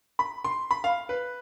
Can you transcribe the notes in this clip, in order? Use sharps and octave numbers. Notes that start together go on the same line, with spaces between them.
B5
C6
B5
F5
B4